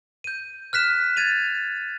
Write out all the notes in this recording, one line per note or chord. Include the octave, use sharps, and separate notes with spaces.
G6 D#7
F6 F#6 B6 E7
G#6 A6 D#7 F7